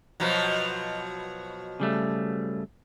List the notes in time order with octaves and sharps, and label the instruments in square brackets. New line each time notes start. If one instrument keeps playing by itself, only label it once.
[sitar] B2 F3 F#3
[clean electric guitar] C#3 G3 A3